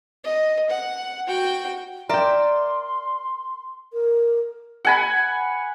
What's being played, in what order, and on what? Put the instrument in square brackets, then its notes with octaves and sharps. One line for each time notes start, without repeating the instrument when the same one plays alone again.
[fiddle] D#5
F#5
F#4 G5
[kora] A#4 G5 [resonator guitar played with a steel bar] D5 E5 [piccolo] C6
[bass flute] A#4
[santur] F#5 G#5 B5